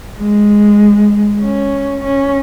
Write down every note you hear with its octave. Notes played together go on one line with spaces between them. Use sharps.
G#3
C#4
C#4